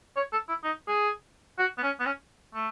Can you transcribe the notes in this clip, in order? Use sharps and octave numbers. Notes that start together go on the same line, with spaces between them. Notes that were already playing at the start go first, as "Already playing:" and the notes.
C#5
A4
E4
D#4
G#4
F#4
B3
C#4
B3
C#4
A3